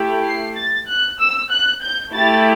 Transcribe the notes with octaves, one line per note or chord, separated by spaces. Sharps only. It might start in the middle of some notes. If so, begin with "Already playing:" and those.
Already playing: A3 E4 G4
C7
A6
F#6
E6
F#6
G6
A3 E4 G4 A6